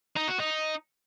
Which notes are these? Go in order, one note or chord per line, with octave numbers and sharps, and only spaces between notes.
D#4
F#4
D#4